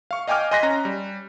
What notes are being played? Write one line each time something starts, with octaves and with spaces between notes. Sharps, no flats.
F5 C#6
D#5 F5 G5 G#5 D6 F6
D#5 G#5 C6 F#6 A#6 B6
C#4 A#5 A#6
G3